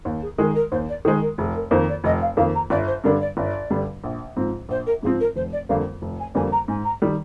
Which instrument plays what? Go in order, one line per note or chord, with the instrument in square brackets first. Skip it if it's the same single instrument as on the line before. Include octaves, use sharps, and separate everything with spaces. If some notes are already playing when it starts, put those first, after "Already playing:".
[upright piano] D#2
[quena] G#4
[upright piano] D#3 G#3 [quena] A#4
[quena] A#4
[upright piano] D#2 [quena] C5
[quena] D5
[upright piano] D#3 [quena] C5
[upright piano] G#3
[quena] A#4
[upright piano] F1 [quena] G#4
[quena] A#4
[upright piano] F2 D#3 A#3 [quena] C5
[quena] D5
[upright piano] F1 [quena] D#5
[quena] F5
[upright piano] F2 D#3 A#3 [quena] F5
[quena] A#5
[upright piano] G1 [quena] D5
[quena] C5
[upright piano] G2 D3 G3 D4 [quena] A#4
[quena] D5
[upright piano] G1 [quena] D5
[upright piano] G2 D3 G3 D4
A#1
G#2 F3 C4
[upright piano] A#1 [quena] C5
[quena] A#4
[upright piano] G#2 F3 C4 [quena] G#4
[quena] A#4
[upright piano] F1 [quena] C5
[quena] D5
[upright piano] F2 D3 G3 A#3 [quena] F5
[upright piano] F1
[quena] G#5
[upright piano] F2 D3 G3 A#3 [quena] G#5
[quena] A#5
[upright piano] G#2 [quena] G#5
[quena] A#5
[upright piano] D#3 G3